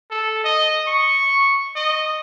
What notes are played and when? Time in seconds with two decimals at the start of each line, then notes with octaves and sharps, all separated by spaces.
0.11 A4
0.44 D#5
0.87 C#6
1.76 D#5